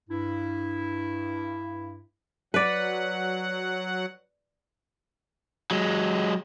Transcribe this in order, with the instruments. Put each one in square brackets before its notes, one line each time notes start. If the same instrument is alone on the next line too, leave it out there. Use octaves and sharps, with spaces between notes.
[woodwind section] G2 E4
[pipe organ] F#3 F#5 [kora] B4 D5
[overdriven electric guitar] F#3 G#3